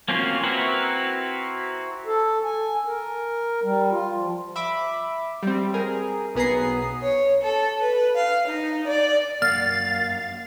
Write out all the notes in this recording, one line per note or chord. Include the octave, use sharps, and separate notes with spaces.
A#3 C4 C#4 F4 F#4
C4 E4 F#4 A#4 B4
A4
G#5
A#4
G3
F4
F3
E5 B5 D6
G3 C4
G#4 A#4
B1 B3 G#4 A#5 C7
C#5
A4
B4
F5
D#4
D5
F#2 A#3 F5 F#5 F6 A6